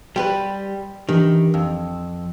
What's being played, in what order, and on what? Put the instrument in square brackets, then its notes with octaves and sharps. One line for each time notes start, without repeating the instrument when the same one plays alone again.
[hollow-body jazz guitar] G3 G4 B4 [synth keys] G5 C6
[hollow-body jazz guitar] D#3 [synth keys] E3 D4 G4
[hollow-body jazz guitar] F2 [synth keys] E6